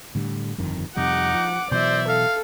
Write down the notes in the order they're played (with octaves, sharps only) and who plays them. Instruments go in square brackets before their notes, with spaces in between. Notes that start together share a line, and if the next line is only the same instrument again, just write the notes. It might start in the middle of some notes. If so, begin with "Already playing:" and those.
[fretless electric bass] A2 D3 G3
G1 F2 D#3
[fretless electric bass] F2 C3 G3 [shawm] D#4 [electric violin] F#5 D6
[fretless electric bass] F3
[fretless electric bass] B2 E3 F#3 [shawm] C5 [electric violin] D5 E5
[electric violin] A4 [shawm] F5